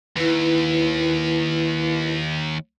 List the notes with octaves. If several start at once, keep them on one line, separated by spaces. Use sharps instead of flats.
D#2 E4 B4